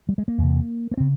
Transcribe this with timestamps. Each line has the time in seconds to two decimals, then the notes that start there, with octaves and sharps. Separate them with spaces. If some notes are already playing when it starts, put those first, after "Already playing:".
0.09 G3
0.18 G#3
0.28 A#3
0.38 E2 C3
0.91 A#3
0.97 C#3 C4